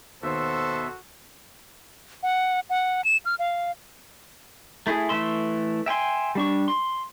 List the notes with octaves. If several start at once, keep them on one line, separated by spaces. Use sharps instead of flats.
D#2 B2 B3 F#4 A4 C5 E5
F#5
F#5
E7
F6
F5
A3 E4 G#4
E3 A3 E5 C6
E5 G5 G#5 C6
G3 D4 C#6
C6